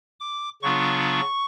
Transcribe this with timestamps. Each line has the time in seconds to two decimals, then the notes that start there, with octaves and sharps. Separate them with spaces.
0.20 D6
0.62 C#3 F#3 B3 D4 F4 C#6